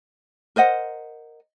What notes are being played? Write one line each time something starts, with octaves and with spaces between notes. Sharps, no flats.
A#4 C5 D#5 F#5